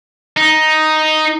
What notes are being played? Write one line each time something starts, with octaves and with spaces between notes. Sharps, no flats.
D#4